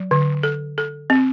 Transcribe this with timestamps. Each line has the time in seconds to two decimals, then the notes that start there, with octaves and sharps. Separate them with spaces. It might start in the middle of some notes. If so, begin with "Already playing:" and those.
Already playing: F#3
0.11 D3
0.43 A4
0.78 A4
1.10 C4